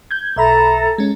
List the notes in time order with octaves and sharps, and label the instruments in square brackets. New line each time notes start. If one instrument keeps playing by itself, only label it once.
[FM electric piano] G6 G#6
[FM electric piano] B1 E5 B5 [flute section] A4 A#5
[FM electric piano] G#3 C#4